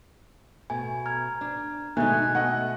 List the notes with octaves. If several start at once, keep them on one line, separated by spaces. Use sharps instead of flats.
B2 A3 G#5
A#5 F6 G#6
D4
B2 G#3 A3 D#4 G#5 F#6
A3 D#5 F#5